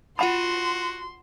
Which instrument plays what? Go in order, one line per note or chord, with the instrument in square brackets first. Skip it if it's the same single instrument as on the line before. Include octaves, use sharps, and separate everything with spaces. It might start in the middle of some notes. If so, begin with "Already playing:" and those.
[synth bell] F4 E7 [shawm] F#4 [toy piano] F#5 B5 [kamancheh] C6